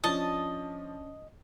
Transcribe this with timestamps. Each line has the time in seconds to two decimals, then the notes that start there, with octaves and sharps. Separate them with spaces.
0.04 F3 C#4 D4 D#5 A5